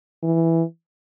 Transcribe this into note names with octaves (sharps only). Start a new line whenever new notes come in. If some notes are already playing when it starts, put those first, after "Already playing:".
E3